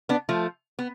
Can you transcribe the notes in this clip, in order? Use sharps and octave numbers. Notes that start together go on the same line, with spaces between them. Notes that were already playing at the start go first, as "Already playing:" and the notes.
B3 D4
F3 A3
B3